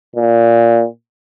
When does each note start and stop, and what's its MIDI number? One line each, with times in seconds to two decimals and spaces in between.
0.16 0.85 46